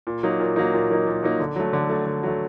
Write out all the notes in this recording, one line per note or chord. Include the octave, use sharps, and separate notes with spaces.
A#2
F#3 A#3 D#4
A#2
F#3 A#3 D#4
A#2
F#3 A#3 D#4
A#2
F#3 A#3 D#4
D3
F#3 A3
D3
F#3 A3
D3
F#3 A3